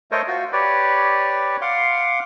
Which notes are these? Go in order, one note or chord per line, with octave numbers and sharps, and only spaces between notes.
A3 A4 A#4 C5 C#5 D#5
F4 F#4
G4 B4 C#5 D5
F5 F#5 C6 D6